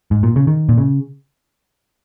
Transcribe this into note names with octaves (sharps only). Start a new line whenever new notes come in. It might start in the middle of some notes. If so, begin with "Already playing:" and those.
G#2
A#2
C#3
D#3
A#2
C#3